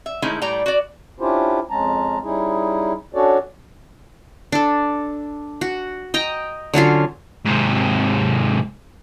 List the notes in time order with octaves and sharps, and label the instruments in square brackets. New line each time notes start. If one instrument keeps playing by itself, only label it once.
[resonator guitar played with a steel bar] E5
D#3 G#3 A3 C#4 D#4 E4
A2 G3 D5 G5 A#5
F#4 D5
[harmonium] C#4 D4 E4 F4 G4 C5
F2 G#3 C#4 A5 A#5
G3 C#4 D#4 E4 G#4
C#4 D4 F#4 A4 C#5 D5
[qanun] D4 A4
F#4
D#5 G5 A#5
D3 F#3 C#4 F4
[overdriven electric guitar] G#2 C3